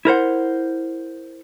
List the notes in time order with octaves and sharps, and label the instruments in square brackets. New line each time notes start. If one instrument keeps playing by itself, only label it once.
[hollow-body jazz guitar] E4 A#4 C5 F#5